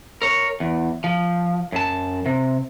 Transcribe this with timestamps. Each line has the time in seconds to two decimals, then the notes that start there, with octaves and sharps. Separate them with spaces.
0.22 A#4 C#5
0.60 E2
1.04 F3
1.72 F#2 A5
2.26 C3